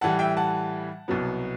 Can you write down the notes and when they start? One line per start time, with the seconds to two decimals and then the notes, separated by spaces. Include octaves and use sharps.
0.01 A2 E3 G3 F#5 A5
0.19 E5 G5
0.37 F#5 A5
1.08 C2 B2 F#3 B3